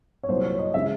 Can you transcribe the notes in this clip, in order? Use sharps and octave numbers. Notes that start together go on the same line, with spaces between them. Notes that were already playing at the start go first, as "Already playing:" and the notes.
C#5
C2 A#2 F#3 B3 C5
C#5
D#5
C#3 E3 G#3 E5